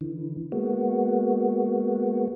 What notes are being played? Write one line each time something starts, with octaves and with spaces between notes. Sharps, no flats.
D3 E3
G#3 A#3 B3 F#4